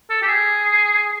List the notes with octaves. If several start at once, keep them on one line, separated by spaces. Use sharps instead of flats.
A4
G4
G#4